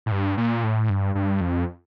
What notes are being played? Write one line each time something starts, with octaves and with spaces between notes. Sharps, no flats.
A2
G2
A#2
A2
G2
G2
F2